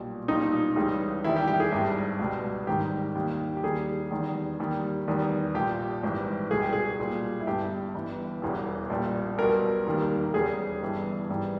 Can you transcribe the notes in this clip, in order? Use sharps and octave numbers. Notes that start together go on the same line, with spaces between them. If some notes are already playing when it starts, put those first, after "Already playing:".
Already playing: B1 A#2 G3
B1 A#2 G3 D#4
C#2 C#3 E3 G3
E2 D#3 G3 E4
G4
G4
G#4
G#1 G2 G3
C#2 B2 G3
G#1 G#2 D#3 G3 G4
D#2 D#3 G3
G4
D#2 D#3 G3 G#4
E2 D#3 G3
D#2 D#3 G3
E2 D#3 G3
A#1 A#2 G3 G4
G#1 G#2 E3 G3
C#2 B2 G3 G#4
G4
G#4
B1 A#2 G3
E4
G1 G2 G3 G4
G1 G2 E3
E1 E2 C#3 E3 G3
A#1 A#2 G3
B1 B2 G3 A#4
E1 D#2 D#3 G3
E2 C#3 G3 G#4
G1 G2 E3 G3
G#1 G#2 E3 G3